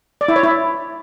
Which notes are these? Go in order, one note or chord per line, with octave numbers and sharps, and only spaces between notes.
D5
E4
C#5
E4